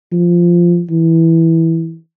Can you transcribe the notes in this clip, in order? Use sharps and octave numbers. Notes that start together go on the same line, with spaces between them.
F3
E3